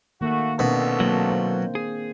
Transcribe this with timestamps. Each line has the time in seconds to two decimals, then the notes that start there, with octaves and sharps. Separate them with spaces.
0.21 D#3 A3 A#3 F#4
0.59 C2 B2 C4 D4 A4 A#4
1.00 F#3 A#3
1.30 C5
1.75 G#4